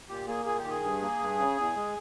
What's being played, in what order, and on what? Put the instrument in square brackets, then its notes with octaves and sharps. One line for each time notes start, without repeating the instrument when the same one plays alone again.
[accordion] A#2 G4
A#3 G#4
A#2 G#4
G4
D#3
G#4
G2
A#3
G2
C#3
E2
G#3